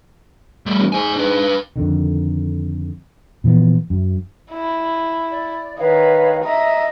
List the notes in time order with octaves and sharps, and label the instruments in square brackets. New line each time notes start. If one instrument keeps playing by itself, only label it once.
[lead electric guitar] G3 A3
[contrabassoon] E1
[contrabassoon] G#2 [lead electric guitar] C5 G#5
[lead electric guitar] D4 B4
[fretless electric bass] F2 D3 D#3
A#2 E3 F3 B3
F#2
[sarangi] E4
[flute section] D5
[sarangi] D#3 [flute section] B4 C#5 F5
[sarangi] D#5 [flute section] E5 A#5